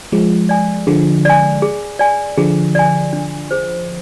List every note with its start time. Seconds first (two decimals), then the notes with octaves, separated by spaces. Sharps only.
0.12 F3 G#3 G#4
0.49 D5 G#5
0.87 D3 F3 G#4
1.25 D5 G#5
1.62 G#4
1.99 D5 G#5
2.38 D3 F3 G#4
2.75 D5 G#5
3.13 D4
3.51 G#4 C5